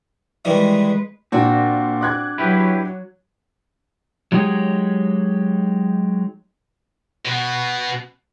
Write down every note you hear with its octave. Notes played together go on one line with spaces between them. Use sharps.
D#3 E3 G3 G#3 B4
A#2 C4 D4 F#4
D6 F#6 G#6
F#3 E4 G4 B4
F#3 G#3 D#4 G4 G#4 C#5
B2 B3